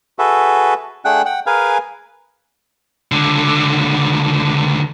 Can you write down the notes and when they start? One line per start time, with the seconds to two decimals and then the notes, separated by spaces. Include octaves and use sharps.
0.19 F#4 G#4 A4 B4 E5
1.05 A3 D4 G#4 F#5 G5 F#6
1.25 F#5 G5
1.46 G#4 A#4 B4 F5 G#5
3.12 C#2 D3